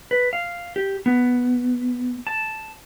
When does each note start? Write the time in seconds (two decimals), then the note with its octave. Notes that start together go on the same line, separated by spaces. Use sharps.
0.11 B4
0.33 F5
0.76 G4
1.06 B3
2.27 A5